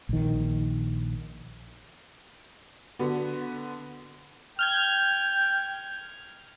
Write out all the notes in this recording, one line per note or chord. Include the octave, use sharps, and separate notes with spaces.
A#1 D#3
D3 B3 F#4
G5 F6 G6 G#6